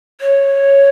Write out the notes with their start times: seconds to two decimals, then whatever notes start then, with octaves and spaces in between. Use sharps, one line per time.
0.21 C#5